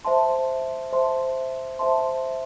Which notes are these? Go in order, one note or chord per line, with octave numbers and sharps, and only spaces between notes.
C5 E5 A5 C6
C5 E5 A5 C6
C5 E5 A5 C6